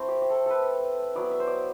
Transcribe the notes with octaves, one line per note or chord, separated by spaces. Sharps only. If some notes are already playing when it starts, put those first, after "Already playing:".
Already playing: A3 C4 E4 C5
G4
G4
A4
A4 B4
F#3 B3 E4 D5
E5
C5
D5